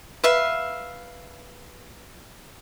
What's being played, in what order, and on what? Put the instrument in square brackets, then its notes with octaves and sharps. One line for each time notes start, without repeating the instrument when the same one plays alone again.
[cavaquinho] B4 E5 F5